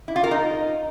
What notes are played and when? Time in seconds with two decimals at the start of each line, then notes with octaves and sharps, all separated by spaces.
0.08 E4
0.16 F4
0.24 A#4
0.31 D#4